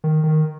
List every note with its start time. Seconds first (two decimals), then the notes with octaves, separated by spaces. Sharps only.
0.04 D#3
0.24 D#3